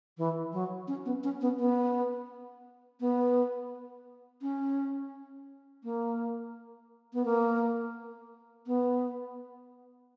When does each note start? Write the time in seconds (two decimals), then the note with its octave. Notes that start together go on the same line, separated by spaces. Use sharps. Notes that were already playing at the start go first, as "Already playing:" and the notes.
0.18 E3
0.53 F#3
0.88 C#4
1.05 B3
1.23 C#4
1.41 B3
1.59 B3
3.00 B3
4.42 C#4
5.84 A#3
7.13 B3
7.25 A#3
8.67 B3